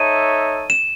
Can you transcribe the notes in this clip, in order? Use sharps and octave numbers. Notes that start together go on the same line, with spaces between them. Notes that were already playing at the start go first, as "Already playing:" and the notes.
Already playing: D#4 A4 C#5 E5 D#7
E7